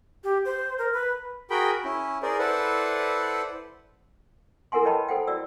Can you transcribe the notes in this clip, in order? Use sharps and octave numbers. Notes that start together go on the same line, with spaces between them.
G4
C5
A#4
B4
F#4 G#4 A#4 G5 B5
C#4 E4
G#4 A#4 C5 D5
E4 A4 B4 C5 D5 F#5
E4 A4 A#4 F#5 G#5 C6
B4 C#5 D#5 G5 A5 B5
A4 C5 F#5 G5
E4 F#4 D5 E6